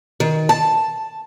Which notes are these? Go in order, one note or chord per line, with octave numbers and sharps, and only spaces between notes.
D#3
A5